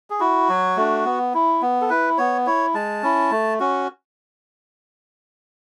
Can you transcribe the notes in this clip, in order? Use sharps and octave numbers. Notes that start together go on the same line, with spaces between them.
G#4
E4 F#4
F#3
A3 D4
B3
E4
B3
A4
E4 B4
B3 C#5
E4 C#5
G#3 A5
C#4 E4
A3
C#4 F#4